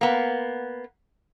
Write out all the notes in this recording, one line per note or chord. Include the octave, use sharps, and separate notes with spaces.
A#3 B3